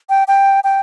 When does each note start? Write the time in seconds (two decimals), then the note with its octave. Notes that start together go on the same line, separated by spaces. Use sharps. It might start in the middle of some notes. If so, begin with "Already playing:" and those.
0.10 G5
0.28 G5
0.64 G5